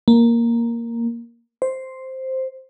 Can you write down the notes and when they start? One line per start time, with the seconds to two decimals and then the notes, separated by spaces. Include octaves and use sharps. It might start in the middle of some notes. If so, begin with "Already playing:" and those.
0.08 A#3
1.62 C5